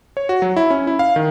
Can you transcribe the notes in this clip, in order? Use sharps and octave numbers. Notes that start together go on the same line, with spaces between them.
C#5
F#4
F#3
E4
C#4
E4
F5
D#3